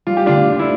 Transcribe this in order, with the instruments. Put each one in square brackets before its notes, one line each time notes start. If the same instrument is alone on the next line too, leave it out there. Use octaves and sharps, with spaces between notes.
[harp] G3 [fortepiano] F4
[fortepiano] G4
[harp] D3 [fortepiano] D4 F4
[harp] D4
[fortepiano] E4